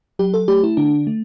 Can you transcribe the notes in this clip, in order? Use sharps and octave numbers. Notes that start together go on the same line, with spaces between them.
F#3 G4
A4
A3 G4
E4
D3 D4
A3